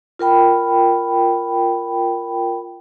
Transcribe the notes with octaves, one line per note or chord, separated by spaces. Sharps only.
F4 A#4 G5 B5